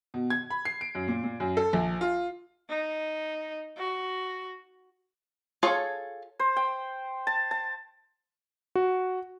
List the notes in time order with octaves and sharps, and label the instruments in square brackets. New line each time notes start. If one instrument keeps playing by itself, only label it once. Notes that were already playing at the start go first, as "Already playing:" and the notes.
[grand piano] B2
G#6
B5
C7
D7
F#2
A#2
A#2
F#2
A4
A#1
F4
[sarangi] D#4
F#4
[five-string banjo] F4 G#4 A4 C#5
[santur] C5
G5
A5
A5
[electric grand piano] F#4